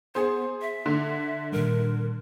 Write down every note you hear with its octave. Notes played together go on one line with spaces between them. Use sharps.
B3 G#4 C5
E5
D3
A#2 D#3 G3 A#4